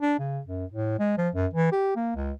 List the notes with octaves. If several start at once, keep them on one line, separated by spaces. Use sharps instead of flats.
D4
C#3
F#2
A2
G#3
F3
F#2
E3
G4
A#3
C#2